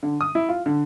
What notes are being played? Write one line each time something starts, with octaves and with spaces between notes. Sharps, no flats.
D3
D#6
E4
F4
D3